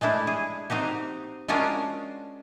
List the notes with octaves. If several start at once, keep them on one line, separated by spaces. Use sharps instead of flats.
G#3 A3 D4 E4
G#4
C4 D#4 F#4 G4
G#3 C#4 D4 F4 F#4 A#4